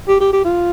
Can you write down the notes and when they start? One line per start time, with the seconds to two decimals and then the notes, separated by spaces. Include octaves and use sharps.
0.08 G4
0.20 G4
0.33 G4
0.45 F4